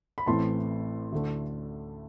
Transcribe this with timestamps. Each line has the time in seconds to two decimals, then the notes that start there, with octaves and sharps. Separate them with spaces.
0.18 B5
0.26 A1 A2 E3 A3 C4 A5 C6
1.12 D2 D3 A3